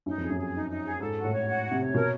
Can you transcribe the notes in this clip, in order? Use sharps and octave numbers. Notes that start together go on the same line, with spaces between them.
F#2 D#4
F2
G#4
F#2
G#4
D#4
D#4
G#4
G#2 A4
F#4
A2
C#5
F#4
C#5
C3
C#5
B2 A#4